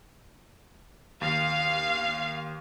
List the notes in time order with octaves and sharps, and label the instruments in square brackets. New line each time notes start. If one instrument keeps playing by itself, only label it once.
[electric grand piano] D#2 [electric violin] F5